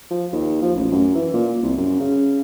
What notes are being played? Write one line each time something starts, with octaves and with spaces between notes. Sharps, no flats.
F3
D#2
F3
A1
F#2
E3
A#2
C2
F#2
C#3